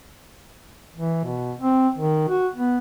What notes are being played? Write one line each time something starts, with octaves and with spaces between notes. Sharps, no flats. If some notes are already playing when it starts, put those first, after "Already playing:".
E3
B2
C4
D#3
F#4
B3